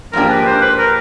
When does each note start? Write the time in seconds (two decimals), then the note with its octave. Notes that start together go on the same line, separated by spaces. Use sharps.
0.13 G#2 F3 A#3 D4 G4 A#4
0.30 B4
0.46 C5
0.61 B4
0.79 A#4